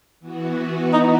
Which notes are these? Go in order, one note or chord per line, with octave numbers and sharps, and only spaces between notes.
E3 B3 F#4
D#4